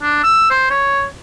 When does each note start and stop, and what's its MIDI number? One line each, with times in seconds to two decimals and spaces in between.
0.02 0.22 62
0.24 0.49 88
0.51 0.66 72
0.71 1.04 73